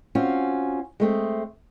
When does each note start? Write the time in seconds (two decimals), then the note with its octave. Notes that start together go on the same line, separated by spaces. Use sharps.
0.15 C4 C#4 F4 F#4
1.00 G#3 A3 C4